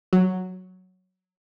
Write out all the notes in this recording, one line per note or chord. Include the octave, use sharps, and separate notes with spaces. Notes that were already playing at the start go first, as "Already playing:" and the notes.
F#3